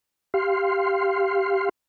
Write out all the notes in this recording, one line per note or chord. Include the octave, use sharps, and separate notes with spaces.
G4 F5 C6